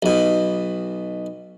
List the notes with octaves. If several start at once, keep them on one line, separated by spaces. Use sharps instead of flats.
B1 B2